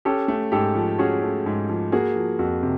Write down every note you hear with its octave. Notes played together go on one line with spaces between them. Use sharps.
C#4 G4 A4
A3
G#2 G4 A4
F3
C#4 F#4 G#4
A3
G#2
F3
A#3 F#4 G#4
F3
F2 F#4
C3